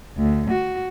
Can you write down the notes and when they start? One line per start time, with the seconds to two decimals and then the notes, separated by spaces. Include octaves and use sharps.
0.17 D2
0.51 F#4